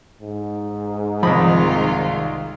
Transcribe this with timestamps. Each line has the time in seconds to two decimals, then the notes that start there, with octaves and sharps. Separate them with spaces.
0.21 G#2
1.23 C2 D#3 F3 F4 D#5 B5